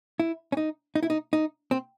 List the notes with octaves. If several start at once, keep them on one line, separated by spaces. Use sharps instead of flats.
E4
C#4
D#4
D#4
E4
D#4
D#4
C4